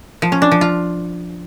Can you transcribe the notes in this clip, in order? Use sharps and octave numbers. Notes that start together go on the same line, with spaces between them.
F3
C#4
D4
F3
F4